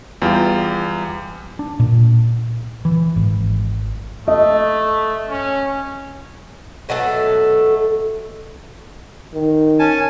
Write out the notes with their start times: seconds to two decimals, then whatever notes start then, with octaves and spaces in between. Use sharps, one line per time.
0.22 E2 G3 F4 G5
1.59 D4
1.80 A#2
2.85 E3
3.16 G#1
4.28 A3 D#5
5.30 C#4
6.89 B2 F#3 A3 A4
9.34 D#3
9.79 C#4 G#5 A5